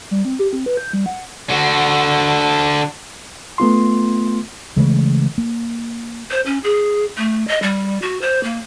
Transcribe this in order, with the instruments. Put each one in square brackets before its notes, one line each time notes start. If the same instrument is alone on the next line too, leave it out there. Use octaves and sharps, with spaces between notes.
[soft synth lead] G3
C4
G4
C4
B4
G6
G3
F#5
[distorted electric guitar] D3 F#4
[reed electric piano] A3 B3 F4 C6
[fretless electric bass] C#3 E3 G#3 A3
A#3
[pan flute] C5
C#4
G#4
A3
D#5
G3
F#4
C5
A#3